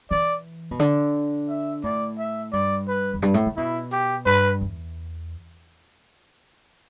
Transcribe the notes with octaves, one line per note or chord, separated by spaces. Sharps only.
E3 D5
B2
D3
E5
A2 D5
E5
G2 D5
B4
E2
G2
A2
D3
B2 E4
G4
G2 B4
E2